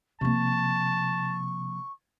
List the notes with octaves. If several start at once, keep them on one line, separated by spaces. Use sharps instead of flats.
C3 F3 A#3 A5 C#6